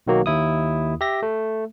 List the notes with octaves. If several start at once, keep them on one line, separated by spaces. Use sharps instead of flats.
B1 D#3 F#3 A#3 F#4
D#2 E4 D#6
G4 E5 A#6
A3